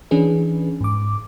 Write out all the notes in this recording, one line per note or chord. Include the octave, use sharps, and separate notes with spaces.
E3 C#4 D4 G#4 B4
G#2 D6